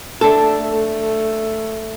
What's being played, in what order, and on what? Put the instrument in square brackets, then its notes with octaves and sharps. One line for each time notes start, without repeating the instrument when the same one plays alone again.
[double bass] A3 [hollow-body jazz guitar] D4 A4